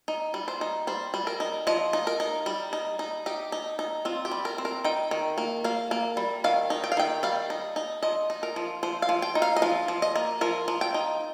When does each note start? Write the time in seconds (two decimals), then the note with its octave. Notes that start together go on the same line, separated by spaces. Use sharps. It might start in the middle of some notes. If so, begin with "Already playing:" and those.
0.08 D#4
0.34 G3
0.48 C5
0.61 D#4
0.87 G3 C5
1.14 G3
1.27 A#4
1.40 D#4
1.67 F3 D#5
1.93 D#4
2.07 A#4
2.20 D#4
2.46 G3
2.73 D#4
2.99 D#4
3.26 D#4 G4
3.52 D#4
3.79 D#4
4.05 C4 F4
4.25 G4
4.31 G3
4.45 A#4
4.58 C4
4.65 A#4
4.84 D#4 G5
5.11 D#3
5.38 A#3
5.64 A#3 F5
5.91 A#3
6.17 G3
6.44 D#3 F5
6.70 D#4
6.84 G5
6.92 F5
6.97 D#3 G5
7.23 G3 F5
7.50 D#4
7.76 D#4
8.03 F3 D#5
8.30 D#4
8.43 A#4
8.56 F3
8.83 F3 C5
9.02 F5
9.09 F3
9.22 G5
9.35 D#4
9.42 F5
9.56 D#5
9.62 F3 F5
9.88 F3
10.02 D#5
10.16 A#3
10.41 F3 A#4
10.68 F3
10.81 G5
10.94 D#4